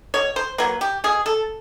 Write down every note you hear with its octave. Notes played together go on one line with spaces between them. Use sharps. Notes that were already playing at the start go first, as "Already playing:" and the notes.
B2 C#5
C5
F#3 A#3 B4
G4
B2 G#4
A4